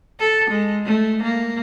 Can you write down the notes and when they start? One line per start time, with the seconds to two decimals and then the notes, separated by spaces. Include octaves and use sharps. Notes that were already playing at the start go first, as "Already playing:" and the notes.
0.20 A4
0.50 G#3
0.86 A3
1.23 A#3